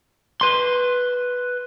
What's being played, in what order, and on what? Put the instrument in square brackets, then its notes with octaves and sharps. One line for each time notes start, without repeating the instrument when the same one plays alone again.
[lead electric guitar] B4 C6